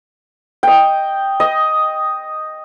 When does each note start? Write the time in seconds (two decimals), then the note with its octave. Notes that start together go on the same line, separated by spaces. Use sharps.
0.63 D#5 G5
1.40 D#5